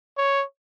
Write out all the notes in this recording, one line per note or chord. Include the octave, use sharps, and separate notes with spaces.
C#5